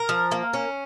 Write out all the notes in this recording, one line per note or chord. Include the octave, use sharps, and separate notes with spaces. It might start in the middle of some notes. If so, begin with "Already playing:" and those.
Already playing: A#4
F3
A#3
C#4